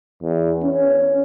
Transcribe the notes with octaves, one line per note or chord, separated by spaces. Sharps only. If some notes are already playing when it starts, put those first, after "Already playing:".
E2
C#4